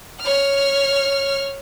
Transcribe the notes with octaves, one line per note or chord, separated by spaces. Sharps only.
C#5 F6